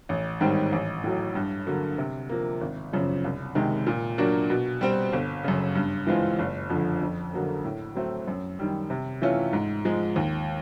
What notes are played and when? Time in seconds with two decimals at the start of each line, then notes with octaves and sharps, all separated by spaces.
0.09 A1
0.41 G#2 D#3 G3 C4
0.72 A1
1.04 A2 F#3
1.35 G2
1.67 D3 F#3 A#3
1.98 C3
2.29 F3 A#3
2.61 G#1
2.93 F#2 C#3 F3
3.24 C2
3.55 C3 D#3 G#3
3.87 A#2
4.18 F#3 A#3 D4 F#4
4.50 B2
4.81 G3 C4
5.13 G1
5.44 F#2 C#3
5.75 G2
6.07 E3 G#3 C4 F4
6.39 F#1
6.70 F2 D3 F3
7.02 F2
7.33 D3 F#3 A#3
7.64 A2
7.95 F#3 A3 C4
8.28 F#2
8.59 D#3 G3
8.90 C3
9.22 E3 A3 C#4 F4
9.53 G#2
9.85 F3 G#3
10.16 D#2